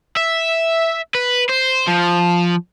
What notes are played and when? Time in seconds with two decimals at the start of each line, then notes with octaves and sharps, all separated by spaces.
0.17 E5
1.15 B4
1.49 C5
1.87 F3